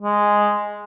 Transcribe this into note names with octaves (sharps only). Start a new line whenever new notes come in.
G#3